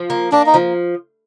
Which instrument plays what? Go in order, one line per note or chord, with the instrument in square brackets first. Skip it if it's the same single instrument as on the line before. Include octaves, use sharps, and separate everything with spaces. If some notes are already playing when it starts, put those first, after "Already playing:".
Already playing: [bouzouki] F3
A#3
[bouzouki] A#3 [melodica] D4
[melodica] D#4
[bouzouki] F3